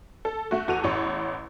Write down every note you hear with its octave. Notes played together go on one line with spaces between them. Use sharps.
A4
A3 F#4
E2 F#4 A4 D#7 F7
A1 E2 C#5